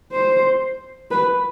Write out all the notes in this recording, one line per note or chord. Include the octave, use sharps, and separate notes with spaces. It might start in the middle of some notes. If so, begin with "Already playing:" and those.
C5
B4